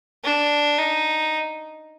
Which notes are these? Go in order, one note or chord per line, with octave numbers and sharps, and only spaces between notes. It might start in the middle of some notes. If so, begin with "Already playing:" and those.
D4
D#4